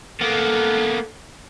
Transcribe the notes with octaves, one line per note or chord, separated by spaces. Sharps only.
A#3 B3 A4